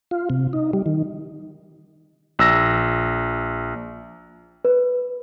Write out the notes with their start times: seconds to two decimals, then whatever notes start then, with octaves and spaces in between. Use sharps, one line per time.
0.11 F4
0.30 C3
0.53 D#4
0.73 G3
0.86 D#3
2.39 A#1 E6 A#6
4.65 B4